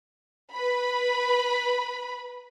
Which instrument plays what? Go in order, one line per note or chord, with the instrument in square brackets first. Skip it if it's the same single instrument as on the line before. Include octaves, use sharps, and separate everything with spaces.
[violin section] B4 B5